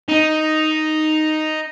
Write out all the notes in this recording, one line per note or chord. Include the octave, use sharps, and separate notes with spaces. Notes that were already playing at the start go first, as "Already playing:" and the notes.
D#4